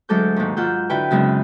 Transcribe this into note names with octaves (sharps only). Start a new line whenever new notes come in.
D2 F#3 G#3 A4 D6 G6
D#2 G#2
G#2 F4 F#5 E6 G6
D3 E4 F#4 B4 G5
F#2 C#3 G#3 B3 C4